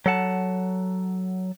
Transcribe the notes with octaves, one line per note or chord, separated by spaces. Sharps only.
F#3 A4 F#5 A5